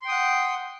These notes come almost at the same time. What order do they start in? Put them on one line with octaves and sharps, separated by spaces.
C6 G5 D#6 F#5